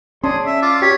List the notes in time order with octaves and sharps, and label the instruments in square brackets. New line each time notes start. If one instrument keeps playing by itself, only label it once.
[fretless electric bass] C#4 [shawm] G#4 [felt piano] D5 A5 C6
[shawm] E5
[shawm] F4 [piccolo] D6
[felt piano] G4 [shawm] C#5 [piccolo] B6